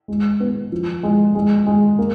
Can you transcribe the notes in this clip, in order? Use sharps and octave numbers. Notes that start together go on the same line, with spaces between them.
G#3
B3
F3
G#3
G#3
G#3
A#3